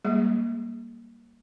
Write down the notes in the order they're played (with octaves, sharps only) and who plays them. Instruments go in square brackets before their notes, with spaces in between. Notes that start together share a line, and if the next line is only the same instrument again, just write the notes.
[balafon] G3 G#3 A#3 G#4